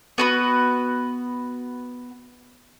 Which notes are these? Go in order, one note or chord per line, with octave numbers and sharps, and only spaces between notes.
B3 F#4 B4